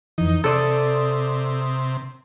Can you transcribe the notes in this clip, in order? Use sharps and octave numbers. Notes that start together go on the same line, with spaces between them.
F2 E3 D#4
C3 A4 D5 C6 D#6 E6